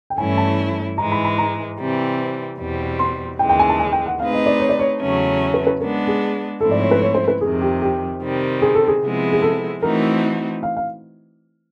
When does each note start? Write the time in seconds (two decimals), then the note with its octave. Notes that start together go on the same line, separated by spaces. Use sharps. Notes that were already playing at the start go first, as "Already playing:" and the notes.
0.10 G5
0.17 G2 E3 A3 C#4 E4 G#5
0.38 A5
0.98 G#2 E3 G#3 A#5
1.12 B5
1.25 B5
1.38 A#5
1.78 C3 E3 G3 C4
2.59 E2 B2 G3 C4
2.99 C6
3.39 D#2 C#3 E3 G#3 G5
3.49 G5
3.60 G#5
3.69 A5
3.80 G#5
3.92 G5
4.06 F#5
4.20 A3 C4 D#4 G#4 B4 F5
4.33 D#5
4.46 D5
4.60 C#5
4.69 D5
4.79 C#5
5.00 E2 C#3 F#3 A3 C#4
5.54 B4
5.67 B4
5.81 G#3 B3 D4 A#4
6.08 G#4
6.61 G#2 F3 A3 C4 E4 A4
6.71 D5
6.81 C#5
6.91 B4
7.01 C#5
7.15 C5
7.28 B4
7.41 F2 C3 D#3 G#4
7.61 G4
7.82 G4
8.22 C3 D#3 G3 C4
8.62 G#4
8.75 A4
8.88 G#4
9.02 C3 F3 G#3 B3 E4
9.32 G#4
9.42 A4
9.82 E3 A3 C4 D#4 F#4 A#4
10.63 F5
10.77 F5